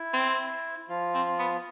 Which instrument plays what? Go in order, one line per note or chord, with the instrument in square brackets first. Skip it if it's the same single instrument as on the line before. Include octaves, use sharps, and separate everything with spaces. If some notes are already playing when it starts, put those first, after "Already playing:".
Already playing: [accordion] E4
[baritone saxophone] C4
[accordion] F3 F4
[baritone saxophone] C4
B3